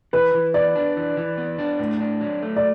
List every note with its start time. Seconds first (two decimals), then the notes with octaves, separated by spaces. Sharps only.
0.13 E3 B4
0.34 E3
0.54 B3 D5
0.75 D4
0.97 E3
1.17 E3
1.38 B3
1.58 D4
1.79 A2
2.01 D4
2.21 F#3
2.42 A3
2.56 D5